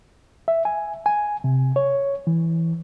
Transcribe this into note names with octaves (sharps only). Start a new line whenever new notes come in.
E5
G#5
G#5
C3
C#5
E3